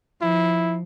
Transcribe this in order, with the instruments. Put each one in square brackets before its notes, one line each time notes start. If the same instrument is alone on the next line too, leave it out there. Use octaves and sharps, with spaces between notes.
[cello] F3 [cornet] E4